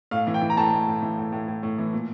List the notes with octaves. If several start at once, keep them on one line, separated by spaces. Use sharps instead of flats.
A2 F5
E3
G5
E3
A#5
A2 A5
A2
A2
E3
A2
A2
A2
A2
E3
A#2